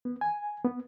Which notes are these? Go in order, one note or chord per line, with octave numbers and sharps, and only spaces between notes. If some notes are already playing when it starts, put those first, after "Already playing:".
B3
G#5
B3